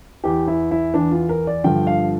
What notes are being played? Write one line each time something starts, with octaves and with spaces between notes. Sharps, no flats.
E2 E3 G4
E4
E4
E2 E3 D4
F4
A#4
D5
G2 D3 F3 G5
F5